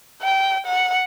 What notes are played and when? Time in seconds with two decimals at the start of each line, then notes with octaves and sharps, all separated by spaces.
0.22 G5
0.66 F#5